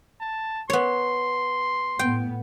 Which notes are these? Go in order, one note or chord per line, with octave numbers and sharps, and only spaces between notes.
A5
B3 C#5 C6
A2 B3 G5